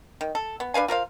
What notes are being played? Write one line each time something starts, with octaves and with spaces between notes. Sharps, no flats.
D#3
A4
B3
D4 B4 F5 G#5
F4 A#4 C5 F5